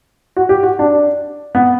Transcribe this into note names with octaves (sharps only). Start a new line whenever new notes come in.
F#4
G4
F#4
D4
B3